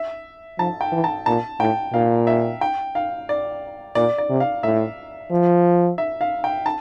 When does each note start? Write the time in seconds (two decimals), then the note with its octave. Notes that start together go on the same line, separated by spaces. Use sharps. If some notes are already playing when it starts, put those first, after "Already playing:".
Already playing: E5
0.59 F3 A5
0.81 G5
0.92 E3
1.04 A5
1.26 A#2 A5
1.59 A2 G5
1.94 A#2 F5
2.27 E5
2.61 G5
2.95 F5
3.29 D5
3.95 A#2 D5
4.18 D5
4.30 C3
4.40 F5
4.63 A2 E5
5.31 F3
5.98 E5
6.21 F5
6.44 G5
6.66 A5